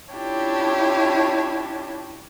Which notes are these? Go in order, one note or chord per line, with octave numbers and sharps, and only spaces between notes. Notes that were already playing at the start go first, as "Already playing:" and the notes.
C#4 D4 E4 F4 G4 C#5